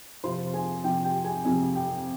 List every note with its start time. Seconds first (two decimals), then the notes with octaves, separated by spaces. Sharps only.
0.23 F2 C3 F3 C5 C6
0.54 G#4 G#5
0.84 F2 C3 F3 G4 G5
1.04 G4 G5
1.24 G#4 G#5
1.45 F2 C3 F3 G#4 G#5
1.75 G4 G5